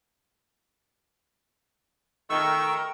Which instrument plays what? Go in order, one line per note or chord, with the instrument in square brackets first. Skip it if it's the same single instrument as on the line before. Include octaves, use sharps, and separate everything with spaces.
[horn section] D#3 A3 [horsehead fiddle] A#4 G5 [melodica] C#6 E6